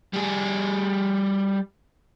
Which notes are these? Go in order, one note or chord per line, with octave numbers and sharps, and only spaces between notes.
G3 G#4